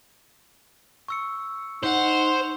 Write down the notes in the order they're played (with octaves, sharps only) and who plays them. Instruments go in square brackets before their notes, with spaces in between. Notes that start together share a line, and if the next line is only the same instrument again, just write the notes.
[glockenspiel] C#6 E6 C#7
[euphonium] D#4 [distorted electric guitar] C5 [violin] F#5 F7 [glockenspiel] G6